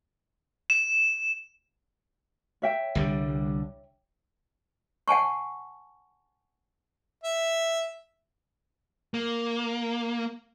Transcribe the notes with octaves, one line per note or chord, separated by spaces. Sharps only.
E7
C#5 E5 G5
C2 D3 G3
F#5 G#5 A5 C#6
E5
A#3